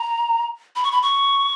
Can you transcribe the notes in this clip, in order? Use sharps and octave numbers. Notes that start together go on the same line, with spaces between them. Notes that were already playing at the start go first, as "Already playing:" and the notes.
Already playing: A#5
B5
C#6
B5
C#6